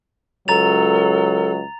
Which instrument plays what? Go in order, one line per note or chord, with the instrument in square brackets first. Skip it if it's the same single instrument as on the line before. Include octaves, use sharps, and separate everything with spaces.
[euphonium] C#2 [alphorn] F#3 [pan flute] A4 [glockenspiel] A#5 A6 F7